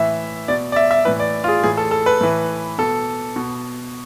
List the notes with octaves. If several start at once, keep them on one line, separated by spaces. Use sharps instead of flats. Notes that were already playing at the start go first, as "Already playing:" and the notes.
Already playing: A2 E3 E5
B2 D5
D5
E5
E5
A2 E3 B4
D5
F4
G#4
A2 E3 G#4
A4
A4
B4
A2 E3
B2 A4
B2